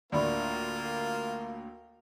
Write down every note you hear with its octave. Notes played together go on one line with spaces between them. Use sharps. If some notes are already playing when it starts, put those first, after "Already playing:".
D2 A2 D3 A#3 F4 D5 B5 C#6